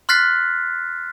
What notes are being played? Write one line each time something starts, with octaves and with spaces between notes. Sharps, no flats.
C6 F6 F#6 A6 B6 C7